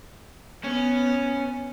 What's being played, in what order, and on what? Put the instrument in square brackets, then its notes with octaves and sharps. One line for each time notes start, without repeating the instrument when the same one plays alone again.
[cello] B3 [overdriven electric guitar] C#4